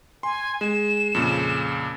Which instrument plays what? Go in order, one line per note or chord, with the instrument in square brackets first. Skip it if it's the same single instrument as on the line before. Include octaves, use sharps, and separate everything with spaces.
[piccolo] G#5 [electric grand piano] C6
[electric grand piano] G#3 [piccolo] E7
[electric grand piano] F2 A#2 C#3